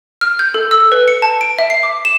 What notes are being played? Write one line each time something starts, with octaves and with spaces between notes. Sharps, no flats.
F6
G6
A4
E6
B4
C#7
A5
D7
E5
C7
D6
E7